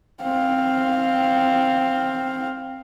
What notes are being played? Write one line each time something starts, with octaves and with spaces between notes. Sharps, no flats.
C4 F5